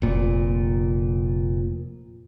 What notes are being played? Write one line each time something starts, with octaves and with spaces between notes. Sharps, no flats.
F1 A#2